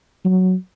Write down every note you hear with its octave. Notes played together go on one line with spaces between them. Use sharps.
F#3